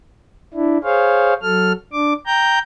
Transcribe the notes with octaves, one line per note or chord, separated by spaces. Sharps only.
D4 E4
G#4 C5 C#5 F5
F#3 A4 F6
D4 D6
G5 A#5 G6